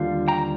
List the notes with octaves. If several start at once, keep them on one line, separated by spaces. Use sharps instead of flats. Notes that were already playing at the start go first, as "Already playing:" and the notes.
Already playing: D#2 D3 G3 F4 F5
G5 A#5